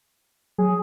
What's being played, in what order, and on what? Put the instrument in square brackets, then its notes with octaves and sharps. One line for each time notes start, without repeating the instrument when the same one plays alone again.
[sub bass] F#3 [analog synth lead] G#4